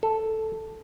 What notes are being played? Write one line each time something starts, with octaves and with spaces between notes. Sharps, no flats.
A4